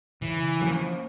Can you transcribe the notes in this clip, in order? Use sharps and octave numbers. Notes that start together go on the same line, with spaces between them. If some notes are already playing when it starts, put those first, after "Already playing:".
C#3 E3
F3 A#3 C#4